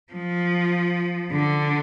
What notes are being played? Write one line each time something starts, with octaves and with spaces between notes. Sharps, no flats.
F3
D3